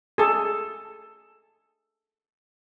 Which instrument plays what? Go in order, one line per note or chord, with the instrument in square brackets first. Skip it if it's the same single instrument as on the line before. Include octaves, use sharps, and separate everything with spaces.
[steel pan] G#4 A4